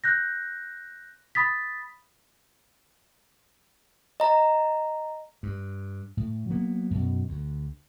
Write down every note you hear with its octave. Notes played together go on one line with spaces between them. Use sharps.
F#6 G6 A#6
B5 D#6 A6 B6
D#5 A#5
G2
A2
F#3 A#3 B3
F#2 B2
D2